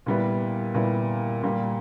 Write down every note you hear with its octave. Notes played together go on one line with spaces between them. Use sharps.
A#2 G3 B3 E4
A#2 G3 B3 E4
A#2 G3 A#3